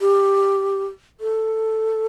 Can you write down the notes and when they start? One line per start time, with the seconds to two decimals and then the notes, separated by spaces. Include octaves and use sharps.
0.01 G4
1.20 A4